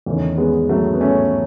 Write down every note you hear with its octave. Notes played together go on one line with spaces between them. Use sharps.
E2 D#3 A3 C#4
G#3 B3
F#3 A3
B3
A3 C#4